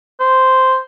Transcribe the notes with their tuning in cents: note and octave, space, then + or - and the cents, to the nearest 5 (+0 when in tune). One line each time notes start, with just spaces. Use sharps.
C5 -5